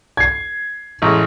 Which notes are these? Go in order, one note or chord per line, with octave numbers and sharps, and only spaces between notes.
G#6 C7
A1 G#3